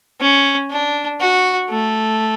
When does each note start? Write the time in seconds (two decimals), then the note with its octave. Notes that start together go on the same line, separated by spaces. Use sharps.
0.21 C#4
0.71 D4
1.21 F#4
1.69 A3